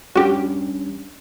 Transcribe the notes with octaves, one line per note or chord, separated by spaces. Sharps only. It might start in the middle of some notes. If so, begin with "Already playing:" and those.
G3 C#4 D4 F#4 G4